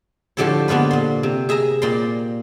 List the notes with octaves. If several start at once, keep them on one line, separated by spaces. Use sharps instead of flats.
A2 D3 F3 G4 A4 C#5
D3 A#3 B3 F4 B4
A#2 C6
C3
G#4 E5 G#5 A#5
A#2 D5 G5 A#5 C6